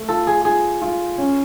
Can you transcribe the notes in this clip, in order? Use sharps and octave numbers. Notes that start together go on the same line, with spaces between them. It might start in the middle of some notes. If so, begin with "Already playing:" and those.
Already playing: A3
F4 A4
G#4
F4 G#4
F4
C#4